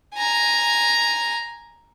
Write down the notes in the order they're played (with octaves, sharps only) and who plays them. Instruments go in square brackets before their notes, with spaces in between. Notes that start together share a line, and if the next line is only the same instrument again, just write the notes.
[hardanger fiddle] G#5 A#5